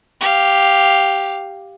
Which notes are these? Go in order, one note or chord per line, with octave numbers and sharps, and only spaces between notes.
G4 F5